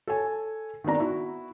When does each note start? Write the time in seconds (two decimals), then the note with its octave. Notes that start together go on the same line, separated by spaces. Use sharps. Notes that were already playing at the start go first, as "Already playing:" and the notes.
0.08 A4 C#5 G#5
0.84 D#3 B3 C4 D4 A#5
0.99 B3 E4 F#4